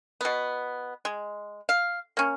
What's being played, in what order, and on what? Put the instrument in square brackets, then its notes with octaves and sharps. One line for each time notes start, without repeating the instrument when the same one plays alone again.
[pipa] B2 B3
G#3
F5
A#3 C#4